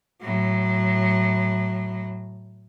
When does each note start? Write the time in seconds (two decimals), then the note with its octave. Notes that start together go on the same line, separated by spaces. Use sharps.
0.21 A2 F#3